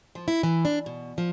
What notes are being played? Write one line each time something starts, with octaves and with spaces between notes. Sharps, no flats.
F3
E4
E3
D4
B2
F3